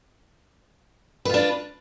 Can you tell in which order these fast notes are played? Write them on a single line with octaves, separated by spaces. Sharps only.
B4 F4 D4